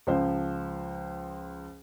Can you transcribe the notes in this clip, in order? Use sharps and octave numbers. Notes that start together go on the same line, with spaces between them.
C#2 F3 C5